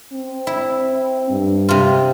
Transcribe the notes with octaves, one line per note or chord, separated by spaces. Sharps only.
C4
E4
G2
C3 F4